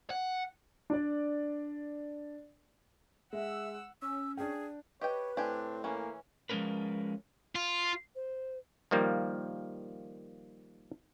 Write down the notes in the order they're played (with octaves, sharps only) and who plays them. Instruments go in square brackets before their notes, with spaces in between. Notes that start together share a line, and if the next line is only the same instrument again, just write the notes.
[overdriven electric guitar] F#5
[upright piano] D4 D5
[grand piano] G#3 [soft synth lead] E5 [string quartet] F#5 E6
[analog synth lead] C#4 [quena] E6
[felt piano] D4 G5 [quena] G#4
[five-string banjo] G4 D#5 G5 [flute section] B4 [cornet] C#5
[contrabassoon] A2 [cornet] C4 [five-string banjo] D4 G4 G#5
[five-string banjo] E3 C#4 [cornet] A#3
[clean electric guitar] F3 G#3 B3 C#4 A#4 B4
[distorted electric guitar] F4
[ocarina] C5
[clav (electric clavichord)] D#3 F3 G3 A#3